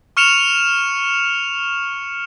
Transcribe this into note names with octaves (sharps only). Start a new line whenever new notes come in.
C#6 F6 C#7 E7 F7